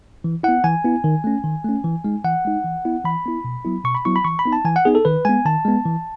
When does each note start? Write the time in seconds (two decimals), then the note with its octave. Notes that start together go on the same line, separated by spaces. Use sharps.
0.24 E3
0.43 B3 E4 F#5
0.64 E3 G#5
0.84 B3 E4
1.04 D#3
1.24 A3 C#4
1.44 D#3
1.65 A3 C#4
1.84 E3
2.04 G#3 D#4
2.24 E3 F#5
2.45 G#3 D#4
2.65 E3
2.85 B3 E4
3.05 E3 B5
3.25 B3 E4
3.44 B2
3.65 F#3 B3 E4
3.84 B2 C#6
3.95 B5
4.05 F#3 B3 E4 C#6
4.16 B5
4.25 E3 C#6
4.39 B5
4.46 B3 D#4
4.53 A5
4.65 E3 G#5
4.76 F#5
4.85 B3 D#4 G#4
4.95 A4
5.05 D#3 B4
5.25 G#3 B3 G#5
5.45 D#3 A5
5.65 G#3 B3
5.85 E3